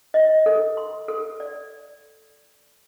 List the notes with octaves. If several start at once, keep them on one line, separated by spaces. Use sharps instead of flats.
D#5
A4
C6
A4
D5